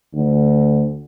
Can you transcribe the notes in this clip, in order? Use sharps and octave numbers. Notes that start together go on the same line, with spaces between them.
D2